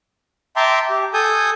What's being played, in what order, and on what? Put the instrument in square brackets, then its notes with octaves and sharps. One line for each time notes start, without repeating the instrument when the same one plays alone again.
[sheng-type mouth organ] E5 G5 A5 A#5 C6 D6
G4
A4 G#5 D#6 G6